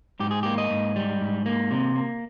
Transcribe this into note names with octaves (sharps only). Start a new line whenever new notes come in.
G#2 G4
G#4
A#3 G4
D#5
G#2
G3
G#2
A#3
C3
A#3